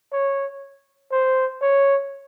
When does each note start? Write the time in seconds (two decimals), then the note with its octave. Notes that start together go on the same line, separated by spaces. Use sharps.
0.12 C#5
1.12 C5
1.62 C#5